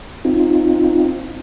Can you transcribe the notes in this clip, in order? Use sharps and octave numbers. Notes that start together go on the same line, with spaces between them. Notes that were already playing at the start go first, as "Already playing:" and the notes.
C4 D#4 F4